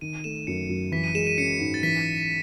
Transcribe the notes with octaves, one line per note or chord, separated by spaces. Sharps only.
D#3 D#7
A3 E7
E7
F#2 C#7
F#2
E3 B6
D#7
G#3 E7
D#7
C#4 C#7
G#2
A6
E3 B6